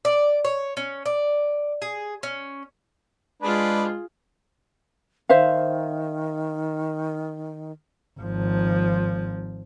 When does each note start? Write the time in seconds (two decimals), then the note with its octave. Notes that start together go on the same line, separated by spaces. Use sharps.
0.05 D5
0.45 C#5
0.77 C#4
1.06 D5
1.82 G#4
2.23 C#4
3.42 G#3 D4 F4 G#4 B4
5.29 D#3 C5 E5 F5
8.20 G#1 F3